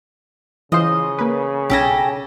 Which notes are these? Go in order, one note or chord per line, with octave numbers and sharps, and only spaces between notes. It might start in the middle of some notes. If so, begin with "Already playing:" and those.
C#3 E3 F4 C5 D#5
A#3 B4
B1 C#4 G4 A4 G#5 A#6